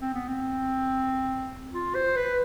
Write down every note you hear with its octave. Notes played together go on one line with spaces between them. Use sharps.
C4
B3
C4
F4
C5
B4